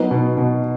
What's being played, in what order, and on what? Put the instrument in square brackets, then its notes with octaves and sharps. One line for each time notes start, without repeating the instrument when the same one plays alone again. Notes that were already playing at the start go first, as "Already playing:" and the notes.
Already playing: [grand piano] F#3 [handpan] B3 D#4
[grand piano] B2
B2